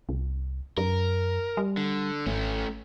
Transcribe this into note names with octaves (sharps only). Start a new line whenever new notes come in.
C2
F#2 A#4
G3
D3
G#1 A3 C#4